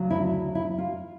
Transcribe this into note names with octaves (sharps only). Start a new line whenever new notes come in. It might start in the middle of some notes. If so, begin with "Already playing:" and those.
Already playing: D2 C#3 F#3
E4
E4
F4